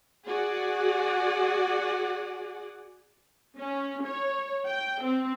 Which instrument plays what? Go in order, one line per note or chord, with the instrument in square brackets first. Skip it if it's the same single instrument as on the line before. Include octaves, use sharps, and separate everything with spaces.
[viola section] F#4 G#4 D5 F#5
C#4
C#5
G5
C4